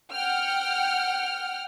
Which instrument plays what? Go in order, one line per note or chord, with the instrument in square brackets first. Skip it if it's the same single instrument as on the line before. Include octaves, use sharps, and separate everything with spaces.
[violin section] F#5 G5 F6